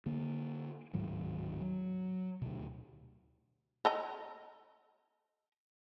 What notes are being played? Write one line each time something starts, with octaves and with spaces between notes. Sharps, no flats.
D3 A#3
D1 G#2 D#3 F#3
F#3
D2 B2
A4 D#5 A#5